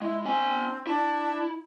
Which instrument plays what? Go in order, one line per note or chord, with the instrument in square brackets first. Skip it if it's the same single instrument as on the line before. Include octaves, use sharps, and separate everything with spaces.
[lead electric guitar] G#3 [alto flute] E4
[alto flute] C4 [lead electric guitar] D4 G#5
[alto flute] D4 [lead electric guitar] E4